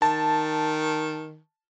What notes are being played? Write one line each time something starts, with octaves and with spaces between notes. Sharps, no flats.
D#3 A5